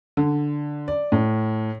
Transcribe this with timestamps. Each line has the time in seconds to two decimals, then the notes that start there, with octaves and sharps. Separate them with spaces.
0.17 D3
0.88 D5
1.12 A2